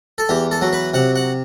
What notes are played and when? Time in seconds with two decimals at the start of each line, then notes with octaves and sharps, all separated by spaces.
0.18 A4
0.29 E2 G4
0.51 A4
0.62 F#3
0.73 B4
0.94 C3 F#5
1.16 F#5